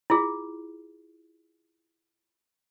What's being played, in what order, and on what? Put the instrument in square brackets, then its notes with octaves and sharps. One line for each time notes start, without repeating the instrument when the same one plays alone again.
[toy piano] E4 F4 G#4